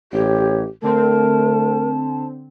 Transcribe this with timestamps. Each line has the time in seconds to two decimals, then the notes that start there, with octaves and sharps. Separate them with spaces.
0.13 A1 G4 C#5
0.83 D3 A3 C4 A#4 A5